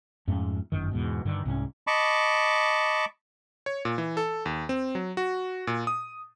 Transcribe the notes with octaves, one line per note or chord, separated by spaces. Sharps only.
F2 G#2 A3 C#4
G1 F#2 D#3
E2 G#2 B2
G2 D3 D#3
C2 G#2 G3 C#4
D#5 A5 B5 C#6 D6
C#5
A#2
E3
A4
D#2
C4
F#3
F#4
A#2
D#6